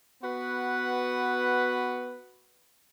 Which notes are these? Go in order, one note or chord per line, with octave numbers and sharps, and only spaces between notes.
B3 F#4 B4